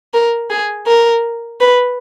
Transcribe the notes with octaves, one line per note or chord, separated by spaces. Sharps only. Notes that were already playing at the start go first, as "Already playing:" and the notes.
A#4
G#4
A#4
B4